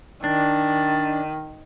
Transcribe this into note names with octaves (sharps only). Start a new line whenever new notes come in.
D#3 D4